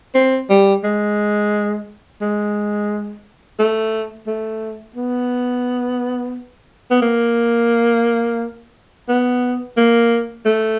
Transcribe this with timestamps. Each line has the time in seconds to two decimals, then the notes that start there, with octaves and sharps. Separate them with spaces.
0.15 C4
0.50 G3
0.84 G#3
2.21 G#3
3.59 A3
4.27 A3
4.96 B3
6.91 B3
7.02 A#3
9.08 B3
9.77 A#3
10.46 A3